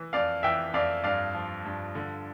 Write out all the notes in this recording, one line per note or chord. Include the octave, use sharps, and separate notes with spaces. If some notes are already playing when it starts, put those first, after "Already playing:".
Already playing: E3
F2 D5 F5
E3 E5 G5
F2 D5 F5
G2 D5 F5
F3
G2
D3